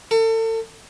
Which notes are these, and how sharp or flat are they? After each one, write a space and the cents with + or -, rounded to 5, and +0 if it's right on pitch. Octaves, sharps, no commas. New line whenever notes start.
A4 +35